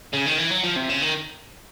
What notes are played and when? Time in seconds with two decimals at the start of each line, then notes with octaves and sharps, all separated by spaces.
0.13 C#3
0.26 D#3
0.38 E3
0.51 F#3
0.63 F3
0.76 C3
0.89 C#3
1.02 D#3